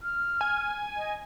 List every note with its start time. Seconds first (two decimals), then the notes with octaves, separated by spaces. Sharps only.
0.03 F6
0.41 G#5
0.97 D#5